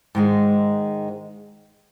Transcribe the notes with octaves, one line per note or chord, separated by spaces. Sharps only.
G#2 D#3 G#3